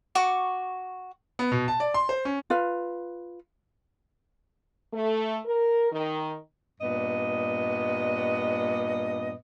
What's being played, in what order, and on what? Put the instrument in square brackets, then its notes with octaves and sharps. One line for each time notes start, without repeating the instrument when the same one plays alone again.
[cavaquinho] F#4 C#6 D6
[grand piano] B3
B2
A5
D5
C6
C5
C#4
[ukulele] F4 B4 F5
[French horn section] A3
A#4
D#3
[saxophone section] G2 A#2 B3 D#5